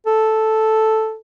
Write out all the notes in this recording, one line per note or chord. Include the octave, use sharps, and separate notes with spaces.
A4